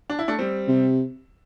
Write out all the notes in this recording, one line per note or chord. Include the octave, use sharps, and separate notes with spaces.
D4
E4
A3 D4
G3 C4
C3